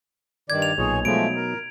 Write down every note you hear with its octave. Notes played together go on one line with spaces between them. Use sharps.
G2 D#3 D5 G#6
F7
B1 A#2 D#4 G#4 C#5
B2 F3 F#3 G#3 A3 D#4 D7
A#4